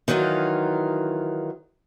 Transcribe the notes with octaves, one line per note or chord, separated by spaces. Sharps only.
D#3 E3 F#3 D#4 F4